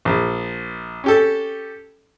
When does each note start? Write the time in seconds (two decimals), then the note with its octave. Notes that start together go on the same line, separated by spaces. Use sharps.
0.05 A#1
1.04 C#4 G4 A4